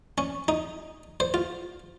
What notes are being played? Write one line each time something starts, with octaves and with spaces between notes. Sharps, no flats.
C#4
D#4
C5
F4